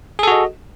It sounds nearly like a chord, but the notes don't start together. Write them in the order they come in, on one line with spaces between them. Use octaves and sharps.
G#4 A4 F#4 D#5